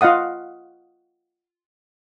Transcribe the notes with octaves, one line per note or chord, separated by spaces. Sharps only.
F4 D#5 F5 F#5 D#6